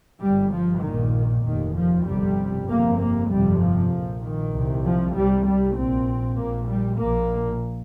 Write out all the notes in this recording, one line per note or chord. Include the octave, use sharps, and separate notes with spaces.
G1 G2 G3
F3
A#1 A#2 D#3
F1 D#2 D#3
F3
G1 F2 C3 G3
G1 F2 C3 A#3
A#3
G1 F2 C3 G3
F3
A#1 A#2
D#3
C2 C3
F3
C2 C3 G3
G3
A#1 A#2 C4
A#1 A#2 A#3
G3
A#1 A#2 A#3